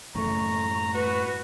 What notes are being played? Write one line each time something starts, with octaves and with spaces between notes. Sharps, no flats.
F#2 A2 C#3 E3 A3 A#5 C#6
F#4 B4